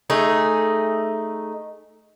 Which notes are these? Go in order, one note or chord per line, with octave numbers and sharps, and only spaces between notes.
A3 D#4 G#4